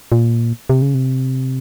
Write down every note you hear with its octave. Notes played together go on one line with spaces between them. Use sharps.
A#2
C3
C#3
C3